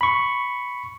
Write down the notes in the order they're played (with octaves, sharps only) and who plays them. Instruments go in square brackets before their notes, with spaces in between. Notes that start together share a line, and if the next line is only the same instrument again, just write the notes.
[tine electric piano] B5 C#6